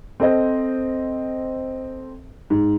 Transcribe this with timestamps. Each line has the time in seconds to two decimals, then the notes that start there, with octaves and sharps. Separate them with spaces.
0.20 C4 A4 C5 D#5
2.50 G#2